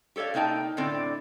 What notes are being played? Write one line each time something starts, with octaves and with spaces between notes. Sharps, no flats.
G4 A4 C#5 D5 F5
C3 A#3 D#4 G5 A5
A2 D3 C4 D5